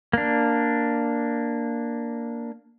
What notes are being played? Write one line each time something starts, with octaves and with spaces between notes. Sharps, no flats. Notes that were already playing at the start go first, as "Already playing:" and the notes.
A#3 D4